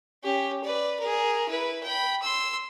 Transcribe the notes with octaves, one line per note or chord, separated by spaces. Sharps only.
C#4 G4
B4 D5
G#4 A#4
E4 B4
G5 B5
C6 E6